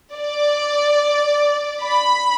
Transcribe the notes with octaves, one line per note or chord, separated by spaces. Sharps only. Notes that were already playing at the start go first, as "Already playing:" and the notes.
D5
B5